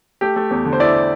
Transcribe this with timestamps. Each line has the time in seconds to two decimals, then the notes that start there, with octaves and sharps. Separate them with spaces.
0.21 A3 G4
0.36 A3
0.51 E2
0.65 D3
0.73 C5
0.80 E4 D5